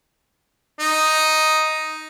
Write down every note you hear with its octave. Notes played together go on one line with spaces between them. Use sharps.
D#4